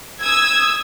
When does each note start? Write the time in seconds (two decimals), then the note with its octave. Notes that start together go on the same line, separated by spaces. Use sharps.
0.21 D#6 E6 G#6